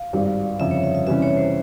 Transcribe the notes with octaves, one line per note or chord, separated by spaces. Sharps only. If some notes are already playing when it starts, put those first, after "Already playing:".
Already playing: F5
G#1 G2 G3
G1 F2 C#3 E5
C#5
E5
E5
C3 E3 G3 C#4 E5
C#5
C5